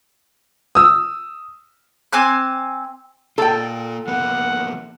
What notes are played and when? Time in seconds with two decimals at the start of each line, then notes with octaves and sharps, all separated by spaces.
0.75 D#6 E6
2.13 C4 G#5 D6 F#6
3.38 A#3 F4 A4 G5
4.07 F3 A#3 B3 F#5